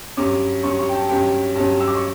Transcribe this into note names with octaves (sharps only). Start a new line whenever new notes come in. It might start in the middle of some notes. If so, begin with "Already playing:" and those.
G2 F#3 C#4 D6
G2 F#3 C#4 C#6
C#6
G5
A5
G2 F#3 C#4 G5
G2 F#3 C#4 A5
E6
D6
C#6